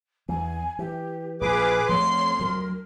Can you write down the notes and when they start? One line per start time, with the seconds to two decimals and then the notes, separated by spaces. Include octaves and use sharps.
0.29 E2 E3 G#5
0.79 E3 G4
1.41 A#1 F4 G#4 B4 D6
1.89 F2 F3 A3 B3 C#5 C6
2.39 D2 F#3 A#4